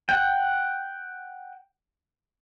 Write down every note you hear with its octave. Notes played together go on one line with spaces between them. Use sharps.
F#5 G5